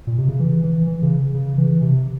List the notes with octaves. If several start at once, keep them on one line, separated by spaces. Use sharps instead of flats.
A#2
C3
C#3
E3
E3
E3
C#3
C#3
E3
C3